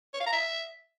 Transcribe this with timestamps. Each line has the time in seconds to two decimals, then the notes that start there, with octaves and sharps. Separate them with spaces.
0.14 C#5
0.20 F5
0.26 A#5
0.33 E5